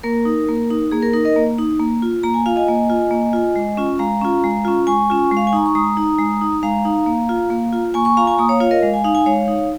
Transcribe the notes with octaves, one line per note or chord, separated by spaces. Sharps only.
A#3 A#4
D#4
A#3
D#4
A#3 G#4
A#4
D#4 A#4
A#4 D#5
A#3
D#4
A#3
F4
A#3 A#5
G#5
F4 F5
D#5 G#5
A#3
F4
A#3
F4
G#3
C#4 F4
G#3 F5 A#5
C#4 F4
G#3
C#4 F4
G#3 G#5 C#6
C#4 F4
G#3
F5
G#5
D#4 A#5
C#6
G#3 A#5 D#6
D#4
G#3
D#4
G#3 F5 A#5
D#4
A#3
F4
A#3
F4
A#3 G#5 C#6
G#5 C#6
F4 F5 A#5
G#5 C#6
A#3 A#5 D#6
C#5 F5
F4 C#5 F5
A#4 D#5
G#3 F5
G#5
D#4 F5
G#5
G#3 C#5 F5
D#4